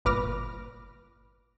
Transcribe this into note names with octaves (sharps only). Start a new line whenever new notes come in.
G1 A#2 B4 D6 F6 A#6